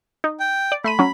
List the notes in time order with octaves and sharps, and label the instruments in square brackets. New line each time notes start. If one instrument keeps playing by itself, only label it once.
[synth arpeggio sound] D#4
[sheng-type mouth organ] G5
[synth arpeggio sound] D5
[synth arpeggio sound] A3 C6 D#7 [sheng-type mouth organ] B5
[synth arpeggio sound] F#3 C#4